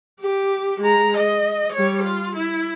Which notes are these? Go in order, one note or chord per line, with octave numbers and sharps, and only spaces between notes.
G4
G#3 A#5
D#5
G3 C#5
F4
E4